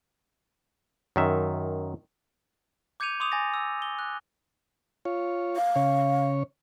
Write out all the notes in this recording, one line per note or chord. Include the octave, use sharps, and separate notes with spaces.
F#2 D#3 E5
D6 G6 G#6 C#7 D#7 F7
C6 D6 D#6 F7
G#5 A6 A#6
E6
G7
F#6
F4 C#5
F5
C#3 C#5